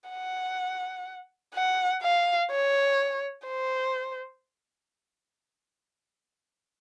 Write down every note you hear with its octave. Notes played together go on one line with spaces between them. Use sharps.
F#5
F#5
F5
C#5
C5